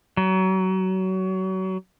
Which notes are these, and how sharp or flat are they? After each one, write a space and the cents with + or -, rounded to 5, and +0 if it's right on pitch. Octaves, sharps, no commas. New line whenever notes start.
F#3 +30